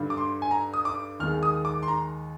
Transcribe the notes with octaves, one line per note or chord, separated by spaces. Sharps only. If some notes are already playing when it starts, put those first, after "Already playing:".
Already playing: G2 D3 G3
D6
C6
G#5
A#5
D#6
D6
D#2 D#3 G#3 F6
D#6
D6
C6
A#5